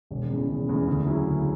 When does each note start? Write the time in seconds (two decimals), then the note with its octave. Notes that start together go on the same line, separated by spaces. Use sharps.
0.11 E1
0.30 E2 C#3
0.48 E1
0.68 E2 C#3
0.87 D2
1.06 C#3 F#3 C#4 E4
1.27 D2